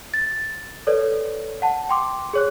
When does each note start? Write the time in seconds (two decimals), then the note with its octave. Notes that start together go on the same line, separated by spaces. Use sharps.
0.14 A6
0.87 A4 B4 C#5 D5
1.62 F#5 A5
1.89 G5 C6 D6
2.33 G#4 C#5 F#6